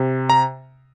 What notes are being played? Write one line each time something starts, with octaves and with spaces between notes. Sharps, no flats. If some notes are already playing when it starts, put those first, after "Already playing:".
Already playing: C3
A#5